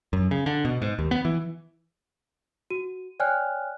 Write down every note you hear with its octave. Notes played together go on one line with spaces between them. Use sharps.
F#2
C#3
D3
B2
G#2
D#2
B3
E3
F#4 D#7
C#5 D5 G5 G#5 F6 F#6